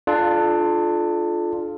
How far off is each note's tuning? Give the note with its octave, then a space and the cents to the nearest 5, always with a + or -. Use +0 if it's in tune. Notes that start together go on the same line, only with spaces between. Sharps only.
D4 +20 F4 +0 A4 -35